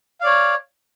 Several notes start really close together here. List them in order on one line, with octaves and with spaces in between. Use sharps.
F5 D5 C#5